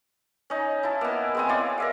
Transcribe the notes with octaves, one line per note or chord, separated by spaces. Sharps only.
C#4 D#4
E4 A5
A#3 B3
G#3 C4 D#6
E4 C#5 D5 F5
A#4 E5 F5